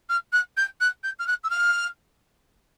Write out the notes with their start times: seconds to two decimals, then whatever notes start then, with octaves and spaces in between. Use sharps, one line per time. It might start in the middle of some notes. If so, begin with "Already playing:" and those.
0.09 F6
0.32 F#6
0.57 G6
0.80 F#6
1.03 G6
1.19 F6
1.27 F#6
1.44 E6
1.50 F6